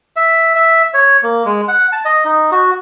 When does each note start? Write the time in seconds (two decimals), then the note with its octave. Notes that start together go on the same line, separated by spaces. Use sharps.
0.16 E5
0.55 E5
0.94 C#5
1.23 A#3
1.45 G#3
1.68 F#5
1.92 A5
2.05 D#5
2.25 D#4
2.52 F#4